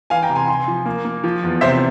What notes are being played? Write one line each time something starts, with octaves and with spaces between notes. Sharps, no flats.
E3 F5 G#5
G5 A#5
C3
G#5 C6
C3 G#5 C6
F3
A#3
A#3
F3
E2
C3 C5 E5